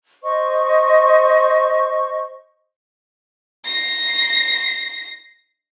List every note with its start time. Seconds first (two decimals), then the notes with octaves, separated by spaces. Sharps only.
0.23 C5 D#5 C#6
3.65 A#6 C7